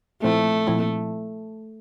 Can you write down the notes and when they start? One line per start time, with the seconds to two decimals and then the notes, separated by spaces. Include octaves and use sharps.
0.23 A#2 F3 A3 C4 E4
0.67 A#2 F3 C4 E4